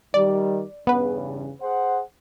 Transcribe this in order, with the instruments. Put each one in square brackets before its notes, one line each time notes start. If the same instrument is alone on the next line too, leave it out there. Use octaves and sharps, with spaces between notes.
[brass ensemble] D#3 G3 [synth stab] D5
[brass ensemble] E2 G2 C#3 [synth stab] B3 B4
[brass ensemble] G#4 C5 F#5